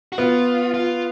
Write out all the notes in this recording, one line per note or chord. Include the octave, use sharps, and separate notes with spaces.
F#4
B3 F4
F4